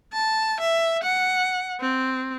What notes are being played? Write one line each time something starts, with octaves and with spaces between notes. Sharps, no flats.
A5
E5
F#5
C4